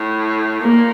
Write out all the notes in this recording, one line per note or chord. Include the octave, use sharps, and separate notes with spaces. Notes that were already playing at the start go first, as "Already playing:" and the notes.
Already playing: A2
A#2 A#3